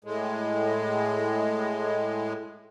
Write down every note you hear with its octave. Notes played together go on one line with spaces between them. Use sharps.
A2 G#3